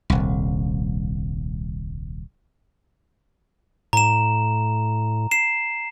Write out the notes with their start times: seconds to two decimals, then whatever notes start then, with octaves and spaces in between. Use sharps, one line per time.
0.10 D#1 C2
3.93 A2 A#5 E7
5.31 C7 E7